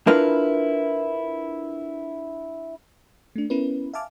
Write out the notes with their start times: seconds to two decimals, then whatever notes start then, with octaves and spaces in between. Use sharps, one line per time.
0.07 D4 E4 F4 A#4 B4
3.36 A3 D4
3.50 B3 C#4 E4 A#4 B4
3.94 E5 F5 G#5 A5 D6 F6